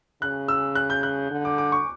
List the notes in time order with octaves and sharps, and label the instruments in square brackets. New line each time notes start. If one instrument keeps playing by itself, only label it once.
[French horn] C#3 [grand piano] F#6
[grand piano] E6
F#6
G6
F#6
[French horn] D3
[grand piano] D6
D6
C#6